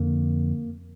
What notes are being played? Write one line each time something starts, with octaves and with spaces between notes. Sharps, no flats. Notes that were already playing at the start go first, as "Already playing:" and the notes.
Already playing: F2 D3 A#3